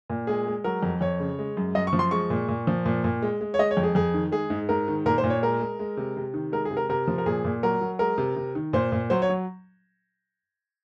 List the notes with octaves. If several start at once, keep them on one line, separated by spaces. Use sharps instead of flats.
A#2
G#3 G#4
G#3
F#3 A#4
F2
F2 C#5
C#3
G#3
F#2
F#2 D#5
C#6
F3
C6
G#3 C#6
A#2
A#2
F3
A#2
A#2
G#3
G#3
C#5
G#3 D#5
C#5
F2
G#4
F2 G#4
D#3
G#3 G#4
G#2
G#2 A#4
D#3
A#2 A#4
C5
A#2
C#5
G#3 A#4
G#3
G#3
C3
C3
D#3
G#3 A#4
G#4
C3
A#4
C3 A#4
F3
A#4
A#2 G#4
A#2
F#3 A#4
F#3
G#3 A#4
C3
C3
D#3
A#2 C5
A#2
F#3 C5
C#5
F#3